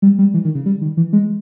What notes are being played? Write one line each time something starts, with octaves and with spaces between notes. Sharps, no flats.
G3
G3
E3
D#3
C#3
G3
D#3
E3
G#3